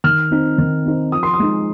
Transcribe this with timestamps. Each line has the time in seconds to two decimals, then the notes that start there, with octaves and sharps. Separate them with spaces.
0.04 D#3 F6
0.31 C4 D#4
0.58 D#3
0.85 C4 D#4
1.12 F3 D#6
1.23 C6
1.34 D#6
1.39 G#3 D#4